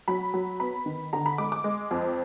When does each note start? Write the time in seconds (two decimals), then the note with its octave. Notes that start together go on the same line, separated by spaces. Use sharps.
0.08 F#3 B5
0.34 F#3
0.60 B3 B5
0.86 D#3
1.13 D3 A#5
1.26 B5
1.38 G#3 D6
1.52 D6
1.64 G#3
1.91 F2